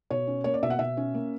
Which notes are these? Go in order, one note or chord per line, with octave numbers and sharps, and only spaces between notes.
B2 C#5
C#4
A#3 C#5
D5
B2 E5
F#5
B2 E5
C#4
A#3